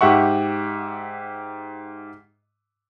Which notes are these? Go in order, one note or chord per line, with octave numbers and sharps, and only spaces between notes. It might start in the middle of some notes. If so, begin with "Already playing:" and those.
G#2 G4 E5 F#5 C#6